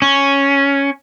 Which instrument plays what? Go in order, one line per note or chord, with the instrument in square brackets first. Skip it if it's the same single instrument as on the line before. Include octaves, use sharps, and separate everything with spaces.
[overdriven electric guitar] C#4